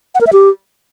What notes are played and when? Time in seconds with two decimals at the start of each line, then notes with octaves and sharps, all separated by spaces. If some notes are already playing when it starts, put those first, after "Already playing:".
0.15 F#5
0.21 A#4
0.27 E5
0.33 G4